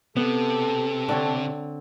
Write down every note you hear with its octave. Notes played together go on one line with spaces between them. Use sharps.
C3 B3 A4
D3 C4 C#5